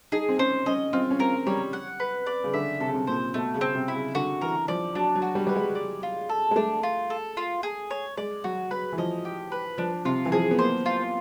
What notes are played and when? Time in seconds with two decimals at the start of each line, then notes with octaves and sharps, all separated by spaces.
0.12 D#4 G#4
0.29 C4
0.39 C#4 C5
0.66 C#4 D#5
0.93 C4 F4
1.11 C#4
1.19 C4 A#4
1.47 G3 C#5
1.73 F#5
2.00 B4
2.26 D5
2.44 C#3
2.54 D3 E5
2.80 C3 A4
2.88 C#3
2.94 C3
3.07 A#2 C5
3.34 B2 A3
3.54 C#3
3.61 C4
3.75 C3
3.88 E4
3.95 C#3
4.15 D3 F#4
4.41 E3 A#4
4.68 F3 D5
4.95 F#3 D4
5.15 F#3
5.22 F#4
5.35 G3
5.47 G3 B4
5.56 G#3
5.75 D5
6.03 F4
6.29 A4
6.51 G#3
6.56 A3 D4
6.83 F4
7.10 A4
7.37 F4
7.63 G#4
7.91 C#5
8.17 G#3 D5
8.44 F#3 F#4
8.71 F#3 B4
8.92 E3
8.98 F3 D#5
9.25 G4
9.52 B4
9.78 F3 D4
10.05 C3 F4
10.25 E3
10.32 F3 G#4
10.51 B3
10.59 A#3 C5
10.86 F4